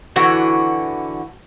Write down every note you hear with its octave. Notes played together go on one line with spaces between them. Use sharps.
D3 E3 F#4